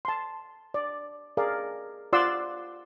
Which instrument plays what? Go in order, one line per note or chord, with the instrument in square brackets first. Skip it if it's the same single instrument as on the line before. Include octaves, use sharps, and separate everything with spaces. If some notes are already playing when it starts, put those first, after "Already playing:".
[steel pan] A5 C6
D5
G#4 A#4 D5 F5
F4 D5 F#5 C6 E6